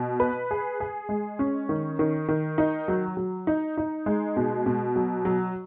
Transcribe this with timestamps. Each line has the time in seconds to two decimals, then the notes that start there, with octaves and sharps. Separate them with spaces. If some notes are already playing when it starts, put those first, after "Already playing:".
Already playing: B2
0.20 B4
0.51 G#4
0.80 G#4
1.09 G#3
1.39 C#4
1.69 D#3
1.99 D#3
2.28 D#3
2.58 D#4
2.88 F#3
3.17 F#3
3.47 D#4
3.77 D#4
4.06 G#3
4.37 B2
4.66 B2
4.96 F#3
5.25 F#3